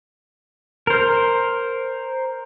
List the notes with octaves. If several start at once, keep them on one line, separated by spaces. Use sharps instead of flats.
A#4 C5